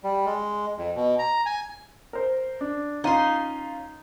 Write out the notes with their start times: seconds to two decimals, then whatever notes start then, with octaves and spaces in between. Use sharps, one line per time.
0.04 G3
0.26 G#3
0.77 F2
0.96 B2
1.19 A#5
1.46 G#5
2.13 A#4 C5
2.61 D4
3.04 C#4 D#4 F4 C6 D#7